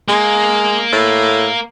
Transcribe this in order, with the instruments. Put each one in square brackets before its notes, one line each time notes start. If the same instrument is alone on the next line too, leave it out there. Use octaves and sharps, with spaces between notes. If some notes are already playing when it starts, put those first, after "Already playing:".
[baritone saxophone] G#3 [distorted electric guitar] A#3
[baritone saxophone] A2